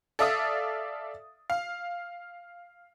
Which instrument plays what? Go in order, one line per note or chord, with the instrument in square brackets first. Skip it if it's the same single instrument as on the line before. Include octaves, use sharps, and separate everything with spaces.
[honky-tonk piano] A4 D5 E5 F5 D#6
F5